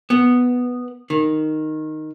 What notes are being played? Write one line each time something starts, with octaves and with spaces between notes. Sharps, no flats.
B3
D#3